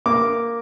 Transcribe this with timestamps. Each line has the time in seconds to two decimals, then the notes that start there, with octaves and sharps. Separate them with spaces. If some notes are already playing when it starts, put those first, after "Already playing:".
0.06 A#3 D6